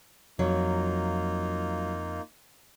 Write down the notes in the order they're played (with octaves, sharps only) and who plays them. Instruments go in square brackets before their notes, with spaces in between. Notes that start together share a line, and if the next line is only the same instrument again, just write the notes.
[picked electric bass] F2 [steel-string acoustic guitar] F#3 [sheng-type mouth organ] A#3 D#4 F4